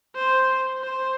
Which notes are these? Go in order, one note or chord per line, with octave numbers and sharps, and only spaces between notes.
C5
C5